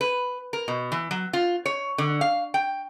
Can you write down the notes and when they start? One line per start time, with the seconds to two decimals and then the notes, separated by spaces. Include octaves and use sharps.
0.01 B4
0.53 A#4
0.68 B2
0.92 E3
1.11 F#3
1.33 F4
1.66 C#5
1.98 D3
2.21 F5
2.54 G5